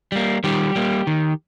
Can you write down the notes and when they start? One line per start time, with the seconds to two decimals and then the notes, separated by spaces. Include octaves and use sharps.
0.12 G3 A#3
0.44 D#3 G3 G4
0.76 G3 A#3
1.07 D#3